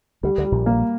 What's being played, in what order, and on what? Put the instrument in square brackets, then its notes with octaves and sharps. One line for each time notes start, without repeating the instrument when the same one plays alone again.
[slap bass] D2 D3 [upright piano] G3
[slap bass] D2 D3
[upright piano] G3
[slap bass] A#1 A#2
[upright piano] A#3